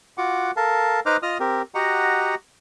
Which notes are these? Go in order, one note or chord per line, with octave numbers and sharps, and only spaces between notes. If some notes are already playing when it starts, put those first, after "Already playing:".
F4 F#4 F#5 D6
A4 A#4 F5 A5
D#4 B4 C5 D#5 D6 F6
F4 D#5 D#6 F6
C4 G4 A#4
F#4 G4 D#5 F#5 A#5